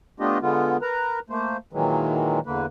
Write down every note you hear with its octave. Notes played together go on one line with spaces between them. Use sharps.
A3 B3 D4 F4 G4 D#5
D3 G#3 B3 F4
A#4 B4 A#5
A3 A#3 C5
A#2 D#3 E3 F#3 G#3
E2 D3 A#3 B4